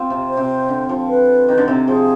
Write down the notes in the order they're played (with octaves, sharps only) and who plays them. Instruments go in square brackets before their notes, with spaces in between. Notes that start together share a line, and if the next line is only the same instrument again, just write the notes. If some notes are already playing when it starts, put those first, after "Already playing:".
Already playing: [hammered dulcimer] C4 F4
C3
[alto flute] C5
[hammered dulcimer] C3
D3
F3
[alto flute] B4
[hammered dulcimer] D#3
D3
C3
[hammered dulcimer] F3 [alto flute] G#4